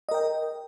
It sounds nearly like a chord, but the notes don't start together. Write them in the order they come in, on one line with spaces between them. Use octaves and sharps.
D#5 A#4 G5